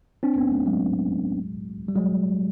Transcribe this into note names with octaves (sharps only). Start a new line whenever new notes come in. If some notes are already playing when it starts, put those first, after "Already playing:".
C4 D4
B3 C#4
C4
A3 B3
F#3 G#3
G3
F#3 G#3